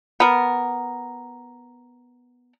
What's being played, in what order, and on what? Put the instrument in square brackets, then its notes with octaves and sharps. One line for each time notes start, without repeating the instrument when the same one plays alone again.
[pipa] B3 A#4